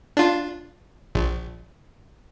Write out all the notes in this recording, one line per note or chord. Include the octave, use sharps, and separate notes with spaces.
D4 F4
A#1